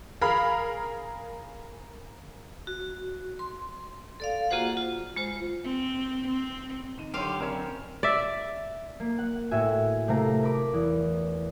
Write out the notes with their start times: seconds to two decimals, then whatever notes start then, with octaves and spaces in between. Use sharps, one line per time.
0.21 G#4 A#4 F5 A#5 B5 F6
2.67 F#4
3.39 C6
4.20 A4 D5 F5
4.50 A#3 F4 F#4 G#4 C5 F#5
4.77 F4
5.16 G#3 F4 C5
5.64 C4
6.28 C4
6.98 D#2 D#4 D#7
7.14 F#1 D3 G4 C5 C#5 F5
7.40 F#1 C4 C#4 A#4 C#5 D5 E7
8.03 D5 E5
9.00 A#3
9.18 F#5
9.51 A2 F#4 E5 G#5
10.08 C3 A3 A#4 F5 A#5 A#6
10.43 A#4 B5 D6
10.74 E2